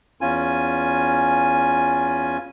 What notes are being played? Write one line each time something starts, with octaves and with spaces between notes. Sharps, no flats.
E2 C#4 F4 G#5